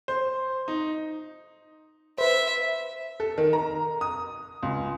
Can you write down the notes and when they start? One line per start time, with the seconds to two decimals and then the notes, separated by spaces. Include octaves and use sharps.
0.08 C5
0.68 D#4
2.18 B4 C5 E5
3.20 A4
3.38 D#3
3.53 A#5
4.01 D#6
4.63 C#2